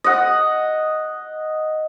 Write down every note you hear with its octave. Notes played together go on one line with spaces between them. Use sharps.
D#5 F#5